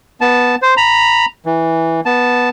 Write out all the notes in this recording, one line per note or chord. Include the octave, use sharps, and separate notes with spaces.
B3 A5
C5
A#5 B5
E3
B3 A5